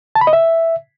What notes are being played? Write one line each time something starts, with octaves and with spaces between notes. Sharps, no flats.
A5
B5
D#5
E5